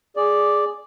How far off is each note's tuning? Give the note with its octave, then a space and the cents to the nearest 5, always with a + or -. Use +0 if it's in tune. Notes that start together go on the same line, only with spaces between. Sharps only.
G#4 +0 D5 +0